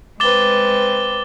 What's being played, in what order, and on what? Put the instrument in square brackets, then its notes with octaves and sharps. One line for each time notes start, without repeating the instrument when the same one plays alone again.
[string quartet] G#3 C4 B4 [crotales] D6 A6 G7